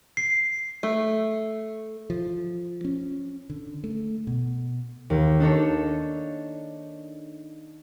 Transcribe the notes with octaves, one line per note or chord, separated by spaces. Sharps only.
C7
A3
F3
C#4
D3
A3
B2
D#2
D4 D#4 A4 C#5